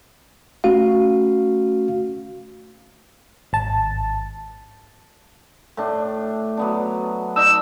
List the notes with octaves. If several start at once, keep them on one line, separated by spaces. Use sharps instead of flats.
A3 C#4 F#4 F5
G#1 A5
A2 D4
F#3 B3 D4
D4 D#4 E6